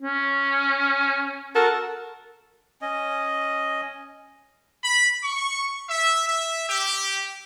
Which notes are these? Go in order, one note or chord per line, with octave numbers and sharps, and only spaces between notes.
C#4
F#4 A4 A#4
C#4 D#5
B5
C#6
E5
E5
G4